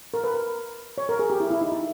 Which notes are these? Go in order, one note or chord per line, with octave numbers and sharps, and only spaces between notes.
A#4
B4
A#4
C#5
A#4
G#4
G4
E4
E4
D#4
E4